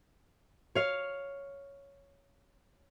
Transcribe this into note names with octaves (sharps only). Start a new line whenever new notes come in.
C#5 F5